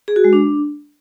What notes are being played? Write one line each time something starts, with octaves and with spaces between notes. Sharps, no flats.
G#4
F#4
G#3
D4